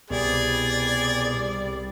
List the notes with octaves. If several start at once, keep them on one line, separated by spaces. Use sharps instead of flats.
C2 B2 G3 G#4 D5